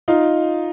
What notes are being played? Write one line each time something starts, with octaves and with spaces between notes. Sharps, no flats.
D#4 F4